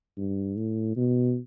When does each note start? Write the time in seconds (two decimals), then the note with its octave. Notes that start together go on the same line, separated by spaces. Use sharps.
0.17 G2
0.57 A2
0.96 B2